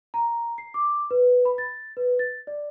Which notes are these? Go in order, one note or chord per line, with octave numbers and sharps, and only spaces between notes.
A#5
C7
D6
B4
B5
A6
B4
A6
D5